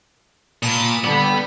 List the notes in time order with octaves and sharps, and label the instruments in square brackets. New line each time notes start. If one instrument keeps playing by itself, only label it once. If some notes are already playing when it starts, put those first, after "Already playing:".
[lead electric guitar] A#2 [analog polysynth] A5 B5 D#6
[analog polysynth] D3 G3 [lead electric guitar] B3 B5